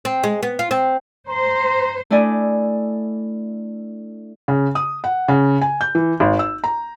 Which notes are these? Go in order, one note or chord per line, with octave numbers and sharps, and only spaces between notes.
C4
G#3
B3
F4
C4
C5 A#5 C6
A3 D4 E4 D5 D#5 G#5
C#3
D#6
F#5
C#3
G#5
G6
E3
G#1
E6
A#5